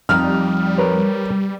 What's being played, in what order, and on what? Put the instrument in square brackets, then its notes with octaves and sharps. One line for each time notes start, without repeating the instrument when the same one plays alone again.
[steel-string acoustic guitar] F2 D#4 G5 [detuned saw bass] G3 [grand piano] F6
[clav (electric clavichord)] A#4 B4 C#5